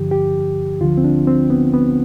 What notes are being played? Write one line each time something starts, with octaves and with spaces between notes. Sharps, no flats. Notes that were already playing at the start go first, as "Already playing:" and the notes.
Already playing: G2 D3 F3 G4
G4
D2 D3 F3 F4
C4
D4
C4
B3
B3